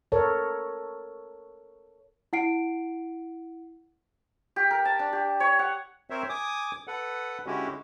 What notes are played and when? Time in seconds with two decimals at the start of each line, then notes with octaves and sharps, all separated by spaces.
0.12 A4 A#4 C#5
2.33 E4 F#5 C7 D7
4.56 G4
4.71 A#4
4.85 A5
4.99 D4
5.13 G4
5.40 C#5
5.59 F#5
6.10 C4 A#4 C5 C#5 E5
6.29 G#5 D6 D#6
6.87 A4 B4 F#5
7.46 D3 G#3 C#4 E4 F#4 G4